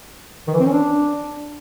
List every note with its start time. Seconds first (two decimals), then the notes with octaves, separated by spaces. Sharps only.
0.47 D#3
0.54 E3
0.60 C4
0.66 C#4
0.72 D4